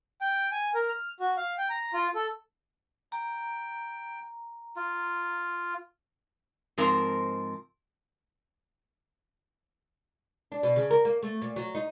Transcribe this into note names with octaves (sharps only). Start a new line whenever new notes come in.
G5
G#5
A#4
F6
F#4
F5
G5
A#5
F4
A4
G5 A#5
F4
G#2 F3 C4 A#4 A#5
D4
B2
C#3
A#4
A#3
A3
A#2
F#3
D#4